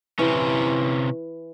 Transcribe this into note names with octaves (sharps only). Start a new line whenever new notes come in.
C3 E3 C#4